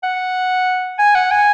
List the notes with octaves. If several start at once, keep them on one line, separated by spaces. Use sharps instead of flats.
F#5
G#5
F#5
G#5